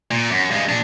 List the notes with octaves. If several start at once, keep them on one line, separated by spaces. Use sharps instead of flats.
A#2
F#2
G2 G#3
A#2 D4